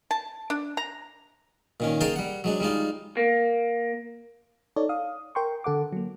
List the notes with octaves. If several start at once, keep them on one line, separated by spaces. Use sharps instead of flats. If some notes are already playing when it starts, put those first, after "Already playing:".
A5
D4
A#5
A#2 D#3 C#4
G#4 A#4 D#5 F5 G5 A5
G3 F#5
F#3 G#3 D4
G3 G#3 D#4 F4
A#3
D#4 A4 C#5 D5
F5 D#6
A#4 G5 C6 C#6
D3 A4 F#5 D6
F#3 A#3